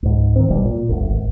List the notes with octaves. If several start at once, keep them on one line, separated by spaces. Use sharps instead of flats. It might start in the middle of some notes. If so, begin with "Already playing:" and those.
C#2 G#2
D#3 C4
D1 G#1 B2 G3
A#2
G1 D2
G#1